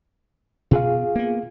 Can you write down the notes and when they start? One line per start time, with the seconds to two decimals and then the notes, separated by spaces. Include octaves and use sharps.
0.71 B2 F4 G#4 F5
1.16 A#3 B3